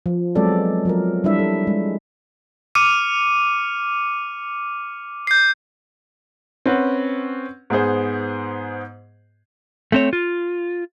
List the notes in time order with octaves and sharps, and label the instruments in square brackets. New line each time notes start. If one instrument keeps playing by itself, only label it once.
[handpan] F3
F#3 G#3 B3 C4 A4 D5
F3 F#3 A#4
G3 D4 E4 E5
A4
G#3
[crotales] D6 F6 C#7 D#7
G6 C7
[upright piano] C4 C#4 B4 F#5
G#2 B3 G#4 C5
[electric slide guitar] A3 C4 C#5
F4